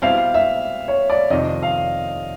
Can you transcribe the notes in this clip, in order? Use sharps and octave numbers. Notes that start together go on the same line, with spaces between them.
B2 G3 C4 E4 F5
E5
C#5
D5
F2 C3 D#3 D#5
F5